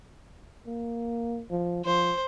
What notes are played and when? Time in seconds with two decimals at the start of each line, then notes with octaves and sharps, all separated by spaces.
0.67 A#3
1.51 F3
1.86 F3 C5